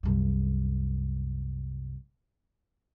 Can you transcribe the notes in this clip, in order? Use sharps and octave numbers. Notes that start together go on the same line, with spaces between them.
C2 F#2